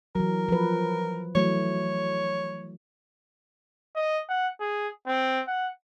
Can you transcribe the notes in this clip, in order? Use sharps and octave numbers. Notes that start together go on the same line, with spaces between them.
E3 F#3 A#4
F3 B4
E3 F#3 A3 C#5
D#5
F#5
G#4
C4
F#5